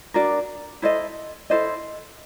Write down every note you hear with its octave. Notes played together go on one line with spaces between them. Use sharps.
D4 F#4 A#4 D5
E4 A4 C5 D#5
E4 A4 C5 D#5